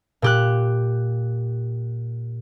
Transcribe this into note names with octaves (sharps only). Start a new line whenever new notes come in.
A#2 G4 F#6